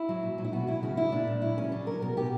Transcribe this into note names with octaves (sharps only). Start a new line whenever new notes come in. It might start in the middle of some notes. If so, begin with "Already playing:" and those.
Already playing: E4
F#3
A#2
F#3
E4
B2 F#4
F#3 E4
C#3 F#4
C#3 E4
A#2 D4
A#2
F#3 E4
C#3 C#4
F#3 D4
F#3 A#4
B2 A#4
B2 G4